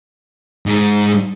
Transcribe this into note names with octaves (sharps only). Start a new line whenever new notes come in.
G#2